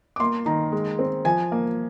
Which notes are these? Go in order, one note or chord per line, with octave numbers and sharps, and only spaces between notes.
D6
A#3 C6
D#3 A#5
G#3
C4
F3 G#5
A#3